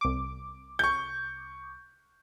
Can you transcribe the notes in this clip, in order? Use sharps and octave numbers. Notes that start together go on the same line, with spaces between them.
C2 D6
C#6 G6